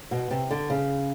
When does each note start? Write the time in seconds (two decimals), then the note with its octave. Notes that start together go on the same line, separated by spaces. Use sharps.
0.11 B2
0.31 C3
0.51 D3
0.70 C#3